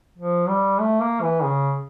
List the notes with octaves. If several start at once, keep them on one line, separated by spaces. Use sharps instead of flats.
F3
G3
A3
A#3
E3
C#3